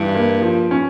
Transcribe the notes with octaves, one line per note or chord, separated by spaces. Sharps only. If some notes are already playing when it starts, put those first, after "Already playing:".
Already playing: G2 E3
A#3
F3
C#4